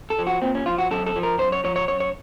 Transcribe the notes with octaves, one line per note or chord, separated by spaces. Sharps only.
A4
F3
F#4
A#2 C4
C#4
F3 F4
F#4
F#2 A4
A4
F3
A#4
F#2 C5
C#5
F3 C#5
C#5
F#2 C#5
C#5